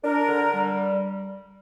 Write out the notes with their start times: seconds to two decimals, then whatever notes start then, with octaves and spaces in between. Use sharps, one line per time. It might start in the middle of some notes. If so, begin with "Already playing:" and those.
0.03 D4 A#4
0.28 D3
0.53 G3